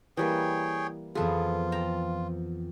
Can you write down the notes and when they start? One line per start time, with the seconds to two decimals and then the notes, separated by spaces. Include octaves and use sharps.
0.17 E3 G3 A#3 G#4 C#5 G5
1.15 F2 E3 B3 F4 G#4 A4
1.72 G5 A5 A#5